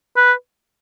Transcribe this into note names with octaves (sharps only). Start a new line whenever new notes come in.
B4